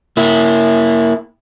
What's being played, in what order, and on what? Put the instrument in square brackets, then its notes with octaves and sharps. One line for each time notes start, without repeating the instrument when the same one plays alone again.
[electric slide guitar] A#3 E4